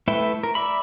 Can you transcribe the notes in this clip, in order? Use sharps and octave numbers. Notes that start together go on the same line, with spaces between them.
A3 E4 B4 E5 G5
A#4
D5 E5 B5